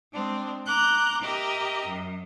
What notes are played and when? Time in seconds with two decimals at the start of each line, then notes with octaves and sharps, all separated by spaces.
0.13 G#3 C4 D4
0.67 A#5 D6 F#6 G6
1.22 G4 A#4 D#5 E5
1.88 F#2